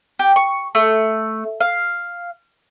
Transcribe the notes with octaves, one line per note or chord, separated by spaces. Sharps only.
G4
C#6
A3
F5